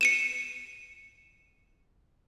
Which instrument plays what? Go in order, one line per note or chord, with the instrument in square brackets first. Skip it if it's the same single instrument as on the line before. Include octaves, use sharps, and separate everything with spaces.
[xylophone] C#7 D#7 E7